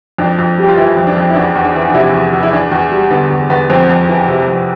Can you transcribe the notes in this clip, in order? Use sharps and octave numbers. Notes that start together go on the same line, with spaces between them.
F2 D4
F2
G3 G4
F4
E3 E4
F2
D4
F2
E4
E2 D4
E2
D4
E3
D4
C3 E4
E2
E2
E4
E2 D4
E2
G3
D3 B3
E2
E2 B3
F2 C4
F2
E3
C3
F2